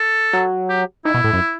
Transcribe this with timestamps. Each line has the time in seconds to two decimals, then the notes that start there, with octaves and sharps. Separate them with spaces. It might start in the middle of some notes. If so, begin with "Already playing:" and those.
Already playing: A4
0.33 F#3
0.69 G4
1.05 D#3 E4
1.14 B2
1.24 A2
1.33 F#2